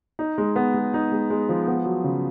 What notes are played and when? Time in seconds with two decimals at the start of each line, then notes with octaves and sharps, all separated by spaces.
0.19 D#4
0.38 G#3
0.56 B3
0.74 G#3
0.94 D#4
1.12 G#3
1.30 G#3
1.49 F3
1.67 B3
1.85 F#3
2.04 C#3